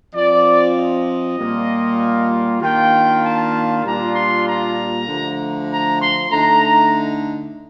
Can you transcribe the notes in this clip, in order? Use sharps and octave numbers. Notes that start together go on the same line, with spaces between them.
F3 C4 F4 D5
D#5
A#2 G3 A#3 F4
D#3 A#3 D4 F4 G5
A5
A#2 G3 A#3 D4 F4 A#5
C6
A#5
D3 F3 A3
A#5
C6
D3 A3 D#4 A#5